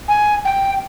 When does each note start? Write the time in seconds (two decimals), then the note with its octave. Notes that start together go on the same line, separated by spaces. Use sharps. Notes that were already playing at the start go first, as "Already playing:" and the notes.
0.08 G#5
0.45 G5